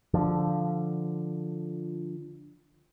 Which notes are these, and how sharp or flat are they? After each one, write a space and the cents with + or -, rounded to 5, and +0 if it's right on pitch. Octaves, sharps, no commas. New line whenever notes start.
D3 +0 F3 +0